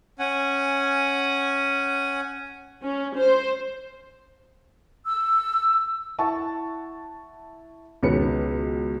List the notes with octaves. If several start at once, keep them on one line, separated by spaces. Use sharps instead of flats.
C#4 F#5 G#5
C#4
C5
E6
E4 F#5 A5 C#6
C#2 B2 D#3 C#4 B4 C#7